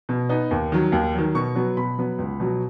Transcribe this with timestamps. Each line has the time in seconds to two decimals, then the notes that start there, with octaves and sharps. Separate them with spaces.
0.09 B2
0.29 B3 D#4
0.51 D#2
0.72 D#3 F#3
0.92 D#2
1.14 D#3 F#3
1.35 B2 C#6
1.55 F#3 B3
1.77 B2 B5
1.98 F#3 B3
2.18 C#2
2.40 B2 F#3